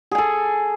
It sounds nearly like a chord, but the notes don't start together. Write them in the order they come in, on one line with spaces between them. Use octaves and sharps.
G#4 G#5 A4